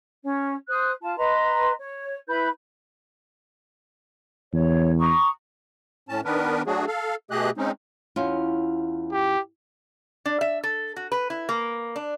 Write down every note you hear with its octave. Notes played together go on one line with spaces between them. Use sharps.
C#4 C#5
C5 D#6 F#6
F4 A5
B4 D#5 A#5 C6
C#5
E4 B4 B5 G6
E2 C#5
A#5 C#6 D#6
A2 C#4 A5
D#3 B3 D4 A#4 B4
F#3 A3 D4 F#4 G#4
A4 F5
B2 A3 G4 G#4 D#5 F#6
G#3 C4 C#4 D#4
E2 C#4 F4
G4
D4
E5
A4
F#4
B4
E4
A#3
D4